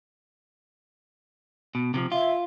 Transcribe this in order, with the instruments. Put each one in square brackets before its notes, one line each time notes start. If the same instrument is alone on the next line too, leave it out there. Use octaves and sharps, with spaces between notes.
[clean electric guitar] B2
C3 D#3 F3
[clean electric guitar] F4 [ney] E5